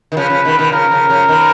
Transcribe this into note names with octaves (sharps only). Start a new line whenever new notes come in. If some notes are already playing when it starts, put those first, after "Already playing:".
D#3
C#3 F3 B4
C#3 F3
B2 D#3
B2 D#3
C#3 F3 A#4
C#3 F3
C#3 F3
B2 D#3